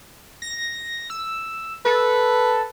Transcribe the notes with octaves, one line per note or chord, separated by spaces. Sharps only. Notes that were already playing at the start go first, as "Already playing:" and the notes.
A#6
E6
A4 B4